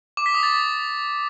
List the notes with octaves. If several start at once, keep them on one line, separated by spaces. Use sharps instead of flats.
D6
B6
D#6
A6